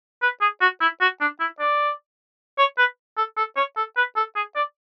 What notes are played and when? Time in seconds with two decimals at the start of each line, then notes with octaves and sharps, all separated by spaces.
0.22 B4
0.41 G#4
0.61 F#4
0.81 E4
1.01 F#4
1.21 D4
1.40 E4
1.60 D5
2.58 C#5
2.78 B4
3.17 A4
3.37 A4
3.57 C#5
3.77 A4
3.97 B4
4.16 A4
4.36 G#4
4.56 D5